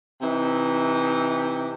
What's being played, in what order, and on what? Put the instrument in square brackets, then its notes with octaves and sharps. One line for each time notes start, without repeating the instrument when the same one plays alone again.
[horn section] C3 E3 D#4